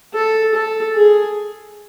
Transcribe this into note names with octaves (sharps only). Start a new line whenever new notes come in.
A4
A4
G#4